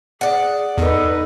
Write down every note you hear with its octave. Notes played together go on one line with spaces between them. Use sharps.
G#4 D5 F#5
E2 D#4 A4 B4